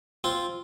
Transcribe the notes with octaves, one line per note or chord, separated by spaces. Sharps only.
C4 F4